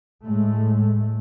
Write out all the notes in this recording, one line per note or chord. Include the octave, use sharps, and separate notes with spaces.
A2 G#3 A3